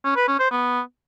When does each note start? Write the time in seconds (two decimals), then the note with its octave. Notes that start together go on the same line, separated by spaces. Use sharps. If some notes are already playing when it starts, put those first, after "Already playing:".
0.05 C#4
0.16 B4
0.28 C#4
0.39 C5
0.51 B3